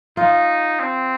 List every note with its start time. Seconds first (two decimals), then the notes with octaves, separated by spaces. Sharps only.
0.17 D#4 F4
0.80 C4